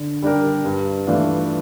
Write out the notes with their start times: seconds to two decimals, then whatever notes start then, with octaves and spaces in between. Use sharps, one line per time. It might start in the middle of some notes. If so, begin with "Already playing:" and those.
Already playing: D3
0.22 G3 D4 G4 A#4
0.65 G2
1.07 E3 A3 D4 F4